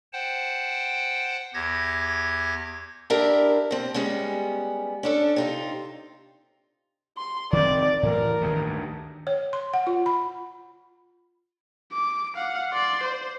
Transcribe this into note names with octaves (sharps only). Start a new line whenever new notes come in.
C5 F#5 G5 A5
E2 G4 G#6 A#6
D4 E4 G4 A#4 E5
B2 C4
G3 G#3 B3 C#4
C#4 D4 A4
C3 D#4 F4
C6
D#3 C4 D5
A2 E3 A#4
D2 G2 D#3
C#5
C6
F#5
F4
B5
D6
F5 F#5
D5 C6
C5